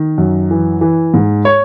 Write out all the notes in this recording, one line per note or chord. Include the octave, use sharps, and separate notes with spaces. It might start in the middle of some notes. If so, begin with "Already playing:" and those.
Already playing: D#3
F#2
E3
E3
G#2
C#5